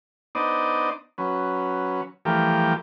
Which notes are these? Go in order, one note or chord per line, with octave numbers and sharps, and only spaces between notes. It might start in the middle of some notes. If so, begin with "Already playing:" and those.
B3 D4 D#4 C5 D5 D#5
F#3 C#4 B4
E3 F3 G3 A3 G4 A#4